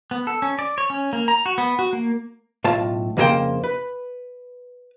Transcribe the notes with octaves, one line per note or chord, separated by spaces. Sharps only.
B3
A4
C#4
D5
C#5
C#4
A#3
A#5
F#4
B3
F#4
A#3
B1 A2 F4 A5
F2 C#3 A#3 G#4 C5 G5
B4